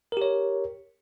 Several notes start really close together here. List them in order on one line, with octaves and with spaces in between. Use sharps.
A#4 G4 C#5